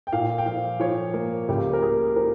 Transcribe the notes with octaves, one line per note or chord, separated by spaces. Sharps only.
G5
A#2 F5
G5
F3 F5
F3 C#5
A#3
C#2 G4
A#4
A#3 G#4
F3 A#4